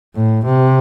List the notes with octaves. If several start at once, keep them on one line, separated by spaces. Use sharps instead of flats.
A2
C3